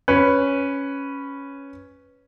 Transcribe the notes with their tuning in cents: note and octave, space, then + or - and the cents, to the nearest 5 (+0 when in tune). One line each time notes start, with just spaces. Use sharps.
C#4 +0 B4 +0